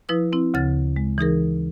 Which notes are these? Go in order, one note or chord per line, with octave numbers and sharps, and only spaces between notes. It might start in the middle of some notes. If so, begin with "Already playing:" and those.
F3 E4 B4 D#6
C4 E4
D2 C#3 A6
G#3
E3 D#4 G#4 A#4